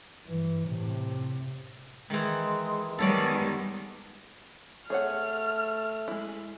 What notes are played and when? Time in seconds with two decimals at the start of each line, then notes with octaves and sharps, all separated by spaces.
0.25 G2 E3
0.66 A2 C3
2.10 D#3 E3 G#3
2.99 D#3 G3 G#3 B3 A4 C#5 D5
4.90 A3 G#4 C#5 F#5 F6
6.08 G#3 E4